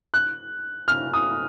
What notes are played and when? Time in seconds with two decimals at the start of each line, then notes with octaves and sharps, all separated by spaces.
0.14 F#6
0.88 F6
1.13 D#6